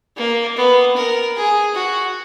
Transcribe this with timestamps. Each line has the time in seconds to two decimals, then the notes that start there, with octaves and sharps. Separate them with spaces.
0.17 A#3
0.57 B3
0.96 A#4
1.36 G#4
1.75 F#4